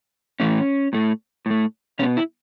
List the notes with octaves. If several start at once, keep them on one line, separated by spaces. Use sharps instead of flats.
A2 E3 A3 C#4
A2 A3
A2 A3
B2 B3 C#4
E4